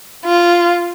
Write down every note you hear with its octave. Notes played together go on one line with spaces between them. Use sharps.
F4